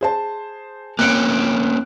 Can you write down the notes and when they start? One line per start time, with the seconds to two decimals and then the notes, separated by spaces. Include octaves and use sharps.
0.01 G#4 C5 A5
0.99 A#3 C4 C#4 F#6 C#7 D7